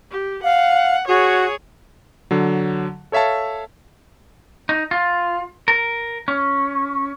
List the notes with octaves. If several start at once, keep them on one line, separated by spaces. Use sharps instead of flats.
G4
F5 F#5
F#4 G#4 C#5
D3 F#3
A4 C#5 E5 F5 A5
D#4
F4
A#4
C#4